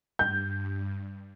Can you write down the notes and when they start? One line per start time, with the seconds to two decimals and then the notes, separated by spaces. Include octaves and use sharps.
0.19 G2 G6